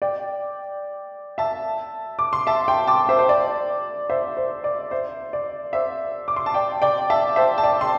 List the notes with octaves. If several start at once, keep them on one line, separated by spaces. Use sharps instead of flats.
D5 G5
E5 A5
D6
C6
E5 A5
G5 C6
A5 D6
C5 E5
C5
D5
C5 E5
C5
D5
C5 E5
D5
C5 E5
D6
C6
A5
D5 G5
D5 G5
E5 A5
C5 E5
A5
D5 G5
C6